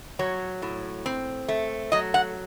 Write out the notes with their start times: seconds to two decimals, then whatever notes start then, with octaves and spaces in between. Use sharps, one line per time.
0.19 F#3 C#5
0.62 A2
1.06 C4
1.48 A3
1.92 F#3 D#5
2.14 F#5